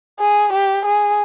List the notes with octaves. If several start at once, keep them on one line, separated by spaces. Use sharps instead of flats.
G#4
G4
G#4